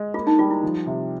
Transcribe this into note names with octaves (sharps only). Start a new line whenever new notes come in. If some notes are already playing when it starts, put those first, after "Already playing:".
Already playing: G#3
A#3 F4
D#4
G3 F4
E4
F3
C3